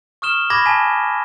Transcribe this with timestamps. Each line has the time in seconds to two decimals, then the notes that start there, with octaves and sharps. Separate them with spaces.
0.22 C#6 D#6 F6 E7 G7
0.50 B5 D6 G#6 A#6
0.66 G#5 A5 B6 D#7